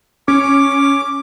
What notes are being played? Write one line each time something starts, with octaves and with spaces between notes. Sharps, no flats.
C#4 D6